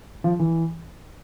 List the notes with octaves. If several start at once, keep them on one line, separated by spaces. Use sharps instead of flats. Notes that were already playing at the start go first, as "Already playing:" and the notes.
F3
E3